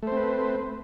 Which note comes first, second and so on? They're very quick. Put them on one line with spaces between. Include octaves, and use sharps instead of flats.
A3 C5 C4 B4